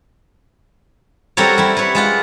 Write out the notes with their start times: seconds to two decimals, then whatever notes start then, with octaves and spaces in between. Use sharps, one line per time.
1.37 G3 C4 F#4 A4 A#4 C#5
1.58 G3 E4
1.77 B4 C#5
1.95 G#3 F4 F#5